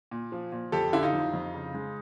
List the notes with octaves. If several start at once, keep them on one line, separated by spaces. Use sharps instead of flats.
A#2
F3
A#2
F2 G4 A4
D3 E4
D#4 F4
F2
F2
C#3
G#3